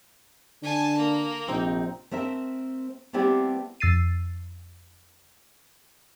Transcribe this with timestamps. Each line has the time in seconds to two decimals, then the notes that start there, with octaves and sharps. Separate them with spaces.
0.63 D3 D4 G#5 A5
0.97 A#3
1.48 A#1 C3 C4 D#4
2.11 A3 C4 A#4 E5
3.13 G3 A3 B3 C4 E4 G4
3.80 F2 E6 A6 C7 D#7